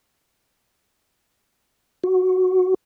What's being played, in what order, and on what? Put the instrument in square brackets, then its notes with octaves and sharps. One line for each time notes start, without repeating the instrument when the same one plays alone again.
[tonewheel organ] F#4